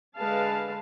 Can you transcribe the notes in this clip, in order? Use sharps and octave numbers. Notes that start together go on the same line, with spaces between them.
D3 G#3 B4 F5 A5